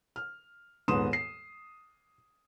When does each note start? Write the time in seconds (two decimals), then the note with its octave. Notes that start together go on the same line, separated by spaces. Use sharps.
0.16 F6
0.88 D#1 G#2 B3 C6 D#6 E7
1.13 C7